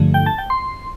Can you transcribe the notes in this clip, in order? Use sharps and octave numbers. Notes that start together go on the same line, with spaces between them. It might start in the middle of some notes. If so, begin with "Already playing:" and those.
Already playing: G2 D3 F3 A3
G5
A5
G5
C6